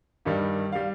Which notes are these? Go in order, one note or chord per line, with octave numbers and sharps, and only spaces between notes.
G2 D#3 G3
G3 F5